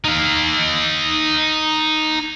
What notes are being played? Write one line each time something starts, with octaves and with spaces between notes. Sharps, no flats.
D#4 F5